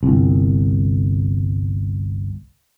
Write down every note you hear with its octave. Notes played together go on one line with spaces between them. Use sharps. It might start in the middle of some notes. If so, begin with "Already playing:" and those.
G1 C2